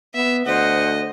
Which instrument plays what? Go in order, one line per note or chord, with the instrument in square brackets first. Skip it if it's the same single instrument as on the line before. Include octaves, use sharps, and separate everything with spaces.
[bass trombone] B3 [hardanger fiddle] E5
[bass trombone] D2 [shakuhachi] C5 [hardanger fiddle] D#5 [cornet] F#5